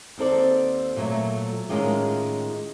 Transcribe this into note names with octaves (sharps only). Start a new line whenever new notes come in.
D#2 C4 A4 D5
A#2 F#3 A3
A2 D#3 G#3 C#4 F4 G4